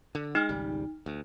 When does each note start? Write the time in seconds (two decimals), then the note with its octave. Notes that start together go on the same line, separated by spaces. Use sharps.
0.15 D3
0.35 G#3 D#4 F6
0.49 G#1 C#2 G3
1.06 D2